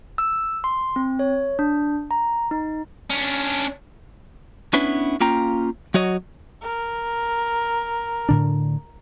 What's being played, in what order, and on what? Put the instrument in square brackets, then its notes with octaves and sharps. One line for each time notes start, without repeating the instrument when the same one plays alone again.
[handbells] E6
C6
C4
C#5
D4
A#5
D#4
[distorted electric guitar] C#4 D4
[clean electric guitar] B3 C#4 D4 E4 B4
A#3 C#4 F4 G5 A#5
F#3 F#4 C#5 D#5
[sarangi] A#4
[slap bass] A2 D3 D4